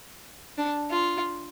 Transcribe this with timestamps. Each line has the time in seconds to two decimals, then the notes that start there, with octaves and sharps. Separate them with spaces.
0.58 D4
0.90 F4